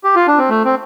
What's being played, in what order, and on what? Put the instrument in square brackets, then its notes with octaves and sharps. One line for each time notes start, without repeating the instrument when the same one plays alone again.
[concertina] G4
F4
D4
C4
A3
C4